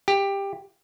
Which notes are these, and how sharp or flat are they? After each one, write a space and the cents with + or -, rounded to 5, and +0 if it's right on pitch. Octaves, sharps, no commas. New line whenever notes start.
G4 +15